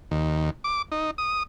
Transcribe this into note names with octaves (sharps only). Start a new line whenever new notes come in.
D#2
D6
D#4
D#6